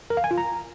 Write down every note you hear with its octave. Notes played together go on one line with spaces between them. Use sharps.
A#4
F5
G#5
F4
A#5